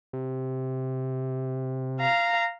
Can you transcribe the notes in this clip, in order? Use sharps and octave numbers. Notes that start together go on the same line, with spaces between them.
C3
F5 A#5